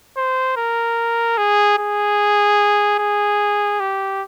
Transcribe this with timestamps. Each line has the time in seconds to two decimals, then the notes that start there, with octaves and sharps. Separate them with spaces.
0.17 C5
0.57 A#4
1.38 G#4
1.78 G#4
2.99 G#4
3.80 G4